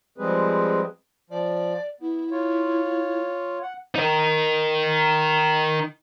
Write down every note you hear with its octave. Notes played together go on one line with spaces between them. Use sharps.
F3 G3 G#3 C4 G#4 B4
F3 D5
B3 E4
F4 C#5
F#5
D#4 A#4